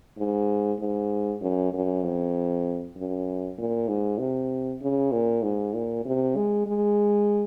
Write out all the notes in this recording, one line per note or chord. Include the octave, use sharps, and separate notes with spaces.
G#2
G#2
F#2
F#2
F2
F#2
A#2
G#2
C3
C#3
A#2
G#2
A#2
C3
G#3
G#3